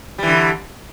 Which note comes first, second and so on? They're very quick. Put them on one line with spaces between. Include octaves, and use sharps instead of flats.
G3 E3 D3